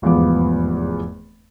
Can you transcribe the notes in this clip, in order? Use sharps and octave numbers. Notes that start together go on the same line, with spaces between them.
F1 E2 G#2 F3 B3 D6